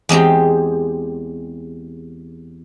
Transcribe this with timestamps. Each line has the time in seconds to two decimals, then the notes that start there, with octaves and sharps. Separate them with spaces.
0.09 E2 G#3 C4 G4